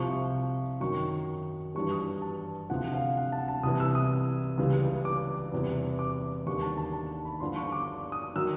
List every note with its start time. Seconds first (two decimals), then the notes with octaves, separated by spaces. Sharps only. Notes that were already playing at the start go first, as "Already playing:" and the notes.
Already playing: C2 C3 F3 C#6
0.80 F#2 D#3 F#3 C#6
1.75 G2 E3 G3 C#6
1.91 D#6
2.22 A5
2.70 D2 C3 F3 F#5
2.94 F5
3.17 F#5
3.32 A5
3.48 A5
3.63 C2 C3 E3 D#6
3.80 E6
3.95 D#6
4.58 C#2 C#3 E3 G3
5.05 D6
5.52 E2 C3 E3 G3
5.99 D6
6.46 D#2 D3 G3 C#6
6.62 A5
6.77 A5
6.93 A5
7.25 B5
7.40 G2 D3 F3 C6
7.56 C#6
7.72 D6
8.12 D#6
8.35 D#3 F#3 E6